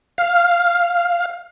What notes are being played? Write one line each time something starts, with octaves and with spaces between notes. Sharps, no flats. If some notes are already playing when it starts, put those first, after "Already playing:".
F5